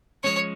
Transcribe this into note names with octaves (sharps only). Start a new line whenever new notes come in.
F3 G#3 C#4 C#5